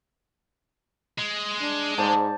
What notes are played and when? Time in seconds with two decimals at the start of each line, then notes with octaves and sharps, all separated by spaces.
1.18 G#3
1.61 D4
1.98 G#2 C5 D5 A5